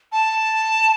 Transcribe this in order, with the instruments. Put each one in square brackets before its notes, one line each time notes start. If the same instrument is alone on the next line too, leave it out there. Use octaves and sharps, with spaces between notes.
[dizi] A5